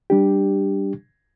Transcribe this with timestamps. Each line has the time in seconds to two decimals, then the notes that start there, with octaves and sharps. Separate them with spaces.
0.10 G3 D4 G4